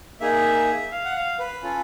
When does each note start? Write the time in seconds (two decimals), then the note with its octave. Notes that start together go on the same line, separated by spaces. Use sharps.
0.20 A#3 D#4 G#4 E5
0.91 F5
1.05 F#5
1.15 F5
1.39 B4
1.63 C#4 F4 A4